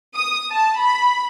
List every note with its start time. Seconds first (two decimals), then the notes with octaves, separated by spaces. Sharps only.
0.15 D#6
0.52 A5
0.82 B5